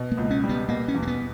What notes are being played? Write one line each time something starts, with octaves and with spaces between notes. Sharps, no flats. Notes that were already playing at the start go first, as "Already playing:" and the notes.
Already playing: B2
A#3
C#2
C#4
G3
B3
B2 A#3
C#4
E2
A#3
B3